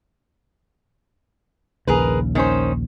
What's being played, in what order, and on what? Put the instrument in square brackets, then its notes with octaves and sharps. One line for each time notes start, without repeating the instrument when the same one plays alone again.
[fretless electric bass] A#1 D#2 C#3 [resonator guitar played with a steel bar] G#4 A#4 B4
[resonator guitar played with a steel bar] D#3 C#4 C5